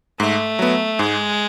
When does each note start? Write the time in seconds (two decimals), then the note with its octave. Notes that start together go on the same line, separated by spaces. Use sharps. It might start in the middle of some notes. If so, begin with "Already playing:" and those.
0.20 G#2 A3
0.59 F#3 B3
0.99 G#2 G#3